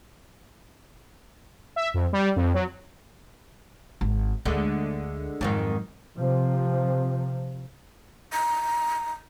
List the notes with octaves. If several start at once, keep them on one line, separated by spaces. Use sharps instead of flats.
E5
F2
G3
F2
F#3
G#1
D2 D3 G#3 A3
F2 G#2 D#3 F#3
C3 F3
A#5